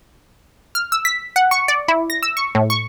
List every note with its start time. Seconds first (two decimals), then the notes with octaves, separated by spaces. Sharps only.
0.75 F6
0.92 E6
1.05 B6
1.36 F#5
1.51 C#6
1.68 D5
1.88 E4
2.10 A#6
2.23 E6
2.37 C#6
2.55 A2
2.70 C#6